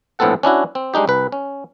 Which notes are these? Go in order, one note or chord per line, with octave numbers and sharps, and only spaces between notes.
A#1 A2 B3 C4 A4 F#5
C#4 D4 E4 F#4
C4
G3 G#3 D4 D#4 G4
C2 B4
C#4